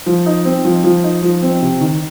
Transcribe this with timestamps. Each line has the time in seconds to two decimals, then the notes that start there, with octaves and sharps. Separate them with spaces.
0.06 F3
0.26 D#4
0.45 C4
0.65 F3
0.84 F3
1.03 D#4
1.22 F3
1.42 C4
1.62 C3
1.81 D#3